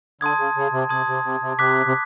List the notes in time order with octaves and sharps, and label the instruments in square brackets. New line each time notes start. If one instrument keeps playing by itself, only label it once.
[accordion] D3 [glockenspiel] A5 C6 D#6 G#6
[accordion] C#3
C#3
C3
[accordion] C3 [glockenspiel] A5 C6 D#6 G#6
[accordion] C3
C3
C3
[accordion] C3 [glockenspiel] D6 F#6 B6
[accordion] C3